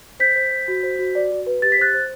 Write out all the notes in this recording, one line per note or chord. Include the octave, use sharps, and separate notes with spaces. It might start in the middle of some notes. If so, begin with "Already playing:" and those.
C5 G6 B6
C5
C5
F#4
C5
F#4
D5
F#4
B4
G4 A6
B6
C5 F#6 A6
C5